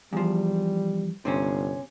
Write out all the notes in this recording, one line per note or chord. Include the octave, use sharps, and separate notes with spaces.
E2 F3 G3
G1 C3 C4 C#4